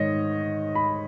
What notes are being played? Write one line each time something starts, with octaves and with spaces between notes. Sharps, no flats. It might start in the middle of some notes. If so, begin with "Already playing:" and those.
Already playing: G#2 D#3 C#5 D#5
B5